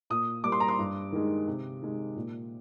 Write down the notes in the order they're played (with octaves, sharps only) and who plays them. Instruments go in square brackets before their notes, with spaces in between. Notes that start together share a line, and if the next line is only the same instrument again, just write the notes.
[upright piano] A#2 D#6
G3 A#3 D6
C6
A#5
C6
G2
D#3 G#3
C3
D#3 G#3
A#2